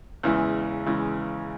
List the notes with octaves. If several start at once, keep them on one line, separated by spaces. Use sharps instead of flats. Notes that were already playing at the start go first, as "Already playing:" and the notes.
E2 C#3 E3 G#3
C#3 E3 G#3